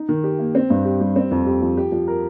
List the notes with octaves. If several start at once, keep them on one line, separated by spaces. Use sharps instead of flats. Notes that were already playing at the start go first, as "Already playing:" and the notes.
Already playing: D#4
D#3
G4
A#3
C4
G2
G4
G3
C4
F2
G4
F3
G4
F3
A#4